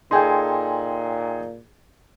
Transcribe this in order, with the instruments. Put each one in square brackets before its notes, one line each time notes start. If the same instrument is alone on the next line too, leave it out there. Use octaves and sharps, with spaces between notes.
[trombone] A#2 [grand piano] D#4 G#4 A4 [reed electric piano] G5 G#5 C6